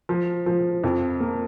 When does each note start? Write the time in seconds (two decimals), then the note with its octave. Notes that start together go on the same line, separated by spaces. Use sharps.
0.09 F3
0.46 F3
0.84 F2
1.20 A#3